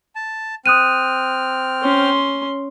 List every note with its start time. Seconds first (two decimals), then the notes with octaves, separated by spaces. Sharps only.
0.16 A5
0.66 C4 D#6 F6 F#6 D#7
1.82 C#4 C6